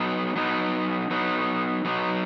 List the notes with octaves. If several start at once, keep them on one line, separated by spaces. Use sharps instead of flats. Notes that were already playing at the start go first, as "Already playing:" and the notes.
Already playing: F#3 B3 D#4
F#3 B3 D#4
F#3 B3 D#4
F#3 B3 D#4